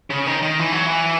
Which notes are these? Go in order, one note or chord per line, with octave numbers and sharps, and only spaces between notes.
C#3
D#3
D#3
E3
F#3
E3